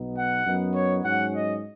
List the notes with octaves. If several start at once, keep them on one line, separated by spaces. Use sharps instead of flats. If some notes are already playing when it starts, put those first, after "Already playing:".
Already playing: B1 B2 B3 D#4
F#5
F#2 F#3 B3 D#4
C#5
G#2 F#3 C#4 F#5
D#5